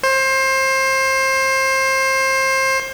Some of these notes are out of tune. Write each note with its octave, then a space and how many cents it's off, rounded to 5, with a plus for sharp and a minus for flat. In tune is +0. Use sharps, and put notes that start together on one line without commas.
C5 +25